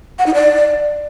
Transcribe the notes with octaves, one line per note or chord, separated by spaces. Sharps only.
F#5
D#4
D5